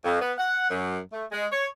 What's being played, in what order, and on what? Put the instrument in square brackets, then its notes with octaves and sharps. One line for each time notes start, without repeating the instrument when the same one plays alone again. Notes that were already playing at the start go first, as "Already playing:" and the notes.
[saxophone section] F2
B3
F#5
F#2
A3
G#3
C#5